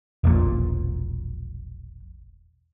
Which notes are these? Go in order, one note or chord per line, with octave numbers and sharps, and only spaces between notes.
E1 A#1 A#2